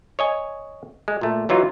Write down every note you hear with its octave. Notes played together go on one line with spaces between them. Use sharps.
C#5 D#5 G#5
G#3
A#2 A3
E3 F#3 D#4 F4